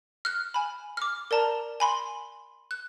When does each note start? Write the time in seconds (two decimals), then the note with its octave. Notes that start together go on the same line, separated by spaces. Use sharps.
0.25 F6 F#6
0.54 G#5 B5
0.97 D6 F6
1.31 A#4 D5 A5 A#5
1.80 G#5 B5 C6
2.71 F#6